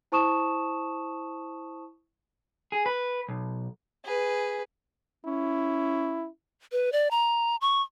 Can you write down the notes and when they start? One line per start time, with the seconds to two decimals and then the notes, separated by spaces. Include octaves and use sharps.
0.12 E4 C5 A5 C#6 D#6 E7
2.72 G#4
2.86 B4
3.28 B1
4.04 G#4 B4
5.26 C#4 E4
6.72 B4
6.92 D5
7.11 A#5
7.61 C#6